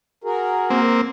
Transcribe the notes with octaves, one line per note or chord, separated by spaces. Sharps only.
F#4 G#4 A#4
A#3 C4